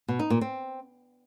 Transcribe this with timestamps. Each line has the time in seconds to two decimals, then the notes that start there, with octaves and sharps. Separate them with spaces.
0.08 B2
0.19 D#4
0.30 A#2
0.41 C4